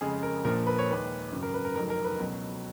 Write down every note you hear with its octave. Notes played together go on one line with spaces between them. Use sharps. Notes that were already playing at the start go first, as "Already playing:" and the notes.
F2 C#3 G#3 G#4
A#4
A#1 A#2 F3 A#4
B4
C#5
D#2 D#3 G#3 B4
G#1 F#2 C#3
A#4
B4
A#4
F1 F2 D#3 F#3 A#4
A#4
B4
C#2 B2 F#3